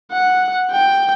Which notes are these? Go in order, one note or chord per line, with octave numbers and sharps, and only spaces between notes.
F#5
G5